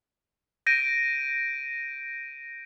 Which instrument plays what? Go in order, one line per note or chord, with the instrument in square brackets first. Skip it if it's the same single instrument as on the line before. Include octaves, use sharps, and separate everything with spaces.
[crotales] G6 A#6 D7 D#7